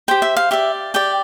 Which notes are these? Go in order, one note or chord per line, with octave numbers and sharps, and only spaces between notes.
G4 C5 G5
E5
F5
G4 D5 E5
G4 D5 G5